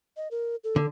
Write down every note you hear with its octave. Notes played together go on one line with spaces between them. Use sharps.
D#5
A#4
A4
D3